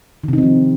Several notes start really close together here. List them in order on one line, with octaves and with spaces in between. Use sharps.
D#3 C3 D#4 C4 F3